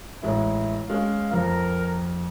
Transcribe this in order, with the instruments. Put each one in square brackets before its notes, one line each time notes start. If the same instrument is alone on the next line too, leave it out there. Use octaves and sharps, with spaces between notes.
[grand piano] A1 G#3 E4
[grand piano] G#3 C#4 [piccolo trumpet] F5
[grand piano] F2 F3 [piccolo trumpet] A#4